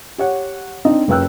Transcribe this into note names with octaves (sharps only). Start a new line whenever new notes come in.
G4 C#5 F#5
C4 D4 D#4 D#5
F#1 F#2 B4 G5 E6 F#6